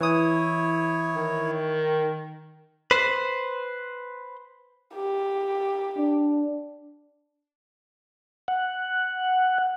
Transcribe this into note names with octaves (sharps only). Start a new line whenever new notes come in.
E3 E4 C#5 D#6
D#3
B4 C5
G4
D4
F#5